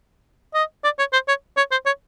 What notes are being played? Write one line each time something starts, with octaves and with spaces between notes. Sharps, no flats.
D#5
D5
C#5
C5
C#5
C#5
C5
C#5